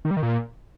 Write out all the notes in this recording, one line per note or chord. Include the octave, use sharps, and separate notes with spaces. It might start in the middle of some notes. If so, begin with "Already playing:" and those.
D#3
G3
D#3
A#2